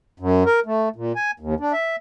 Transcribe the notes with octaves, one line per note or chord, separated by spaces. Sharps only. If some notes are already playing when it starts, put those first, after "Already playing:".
F#2
A#4
A3
A#2
G#5
D#2
D4
E5